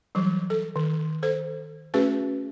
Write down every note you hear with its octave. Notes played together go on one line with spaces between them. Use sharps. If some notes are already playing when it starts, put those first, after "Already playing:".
E3 F#3 G3
A4
D#3
A4 C5
A3 C#4 F#4 G#4 B4